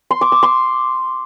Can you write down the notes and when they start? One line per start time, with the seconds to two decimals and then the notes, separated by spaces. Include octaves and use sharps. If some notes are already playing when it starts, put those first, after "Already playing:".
0.11 C6
0.21 D6
0.32 E6
0.43 C6